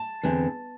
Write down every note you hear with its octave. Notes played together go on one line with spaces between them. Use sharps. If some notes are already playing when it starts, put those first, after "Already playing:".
Already playing: A5
E2 D3 C4